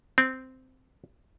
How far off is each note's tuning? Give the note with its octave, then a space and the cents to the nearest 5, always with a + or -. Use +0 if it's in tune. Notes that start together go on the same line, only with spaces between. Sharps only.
C4 -10